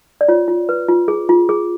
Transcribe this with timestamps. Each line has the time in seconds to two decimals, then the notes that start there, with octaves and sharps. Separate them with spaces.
0.21 D5
0.28 F4 C#5
0.48 F4
0.69 B4
0.88 F4
1.08 G#4
1.29 F4
1.49 G#4